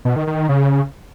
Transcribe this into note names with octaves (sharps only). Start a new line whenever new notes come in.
B2
D#3
D#3
D#3
C#3